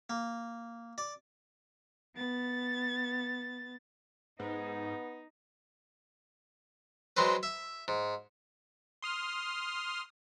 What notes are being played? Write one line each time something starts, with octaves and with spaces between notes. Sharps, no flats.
A#3
D5
B3 A6
G#2 B3 D#4
F#3 G#3 C4 B4
E5
G#2
C6 D#6 F6